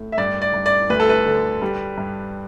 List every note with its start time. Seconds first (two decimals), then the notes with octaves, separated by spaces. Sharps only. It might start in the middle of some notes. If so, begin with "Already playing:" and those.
Already playing: A2
0.12 E5
0.18 G2 D5
0.42 D5
0.54 G2
0.66 D5
0.90 D2 B4
1.00 A4
1.09 B4
1.26 D3
1.62 G3
1.98 G2